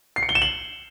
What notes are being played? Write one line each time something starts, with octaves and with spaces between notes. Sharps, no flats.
C7
C#7
G7
E7
F#7